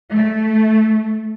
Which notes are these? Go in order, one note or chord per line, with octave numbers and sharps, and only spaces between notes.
A3